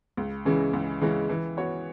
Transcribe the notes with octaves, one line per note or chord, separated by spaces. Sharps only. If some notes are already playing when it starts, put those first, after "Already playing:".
C#2
C#3 E3 G#3 C#4
C#2
C#3 E3 G#3 C#4
E3
B3 F#4 C#5